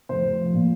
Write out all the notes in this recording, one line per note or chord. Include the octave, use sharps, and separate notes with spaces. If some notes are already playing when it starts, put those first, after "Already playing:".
F1 C5
F1
F3
A#2